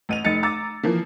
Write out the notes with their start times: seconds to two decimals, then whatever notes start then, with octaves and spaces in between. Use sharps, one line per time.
0.09 A1 D#7 F7
0.25 F1 D#4 A6 C#7
0.43 A#5 D6 E6 A6
0.83 E3 F3 A#3